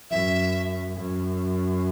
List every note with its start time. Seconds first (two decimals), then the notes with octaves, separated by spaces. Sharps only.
0.11 F#2 E5
0.98 F#2